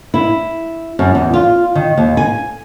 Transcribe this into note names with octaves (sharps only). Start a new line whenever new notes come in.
E4
F#2
E2
F4
D#3
D#2
G#5